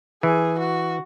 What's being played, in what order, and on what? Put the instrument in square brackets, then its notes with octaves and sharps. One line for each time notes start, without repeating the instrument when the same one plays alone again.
[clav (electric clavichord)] E3 [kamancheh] G#4
[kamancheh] F#4